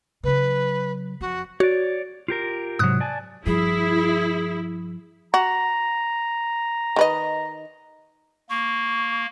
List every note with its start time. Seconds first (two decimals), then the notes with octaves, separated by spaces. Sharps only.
0.24 C#3 F#3 B4
1.21 F2 F#4
1.60 F#4 C#5 D5
2.28 F4 G4 A#4
2.79 G#2 C3 F#3 D#6 F#6
3.00 D5 G#5 A5
3.46 G2 F3 E4 G#4
5.34 F#4 A#5
6.96 D#3 B4 D#5
8.50 A#3 C#6